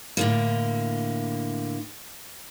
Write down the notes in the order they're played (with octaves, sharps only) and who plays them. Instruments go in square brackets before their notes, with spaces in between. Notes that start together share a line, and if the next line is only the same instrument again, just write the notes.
[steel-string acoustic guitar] A2 D3 A#3